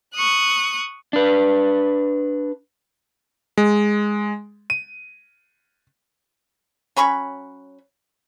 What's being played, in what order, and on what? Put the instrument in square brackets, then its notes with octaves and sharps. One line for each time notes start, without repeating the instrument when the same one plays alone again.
[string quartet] C#6 D#6 F#6
[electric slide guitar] D4 B4
[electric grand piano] G#3
D#7
[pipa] F#3 C#4 B5 C#6